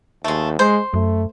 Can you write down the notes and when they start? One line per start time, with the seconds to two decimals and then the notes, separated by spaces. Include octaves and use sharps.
0.24 D#2 G#3 A3
0.59 G#3 C5
0.94 F#2 A3